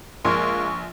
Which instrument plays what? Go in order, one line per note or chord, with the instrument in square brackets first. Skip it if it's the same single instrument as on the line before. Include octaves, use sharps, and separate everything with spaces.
[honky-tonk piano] A#1 [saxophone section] G#3 A#3 [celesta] C6 [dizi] C#6